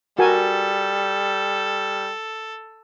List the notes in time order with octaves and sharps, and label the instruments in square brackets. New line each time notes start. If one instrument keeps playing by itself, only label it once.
[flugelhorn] G3 [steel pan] F#4 A#4 G#5 [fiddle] A4